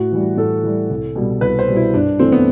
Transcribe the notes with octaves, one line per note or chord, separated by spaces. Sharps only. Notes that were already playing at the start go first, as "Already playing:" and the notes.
Already playing: A2 F#4
E3 G3
A2 A4
E3 G3
C2
B2 G3
C2 B4
C5
B2 G3
E4
G2 D4
E3 A3 C4
B3